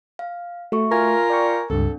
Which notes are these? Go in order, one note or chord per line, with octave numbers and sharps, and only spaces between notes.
F5
A3 F#4 E5 C#6
F4 A#4 G#5 G#6
D5 G5 C#6
C#2 G2 C4 D4 A4